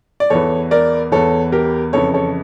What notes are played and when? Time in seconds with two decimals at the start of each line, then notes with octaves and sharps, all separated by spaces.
0.20 D5
0.30 E2 E3 A4 C#5
0.71 A#4 D5
1.11 E2 E3 A4 C#5
1.52 G4 A#4
1.93 F2 C#3 E3 A4 C#5
2.14 A4 C#5